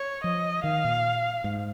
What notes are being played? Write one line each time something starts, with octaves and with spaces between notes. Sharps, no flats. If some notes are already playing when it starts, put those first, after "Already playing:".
Already playing: C#5
F3 D#5
D#3 F5
A#2
G#2